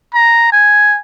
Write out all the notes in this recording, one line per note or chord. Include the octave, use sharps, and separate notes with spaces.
A#5
G#5